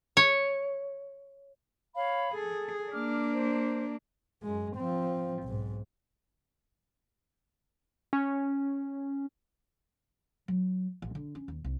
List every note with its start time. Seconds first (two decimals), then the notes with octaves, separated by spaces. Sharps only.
0.17 C#5
1.95 C#5 F5 B5
2.33 G#4 A4
2.92 A#3 D4 D6 F6
3.32 C5
4.43 F#2 G#3
4.76 F3 C4
5.44 B1 G#2
8.13 C#4
10.48 F#3
11.02 A1
11.15 D3
11.35 C#4
11.48 D#2
11.64 C2